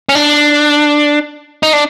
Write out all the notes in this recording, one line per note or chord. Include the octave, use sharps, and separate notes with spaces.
C#4
D4
D#4
D4